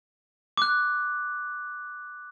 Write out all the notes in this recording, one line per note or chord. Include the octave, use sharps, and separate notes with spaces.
D6 F#6